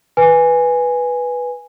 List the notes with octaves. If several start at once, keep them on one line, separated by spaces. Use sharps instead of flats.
B4 G#5